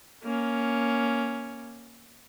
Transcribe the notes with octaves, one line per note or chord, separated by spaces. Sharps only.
A#3 C#4